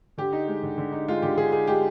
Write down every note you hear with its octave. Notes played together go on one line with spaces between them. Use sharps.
D3 G4
D#4
G#3
D3
D3
D#4
G#3 F4
D3 G4
D3 G#4
D#4 G#4
G#3 G4